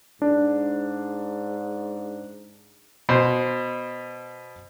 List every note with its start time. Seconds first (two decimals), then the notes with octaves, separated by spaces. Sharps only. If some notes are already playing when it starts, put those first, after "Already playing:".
0.22 G#2 D4
3.09 B2 C5